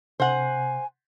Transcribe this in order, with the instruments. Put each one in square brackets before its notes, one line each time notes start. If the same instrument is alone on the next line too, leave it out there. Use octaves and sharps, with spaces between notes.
[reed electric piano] C3 [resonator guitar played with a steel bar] C5 F#5 [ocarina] G#5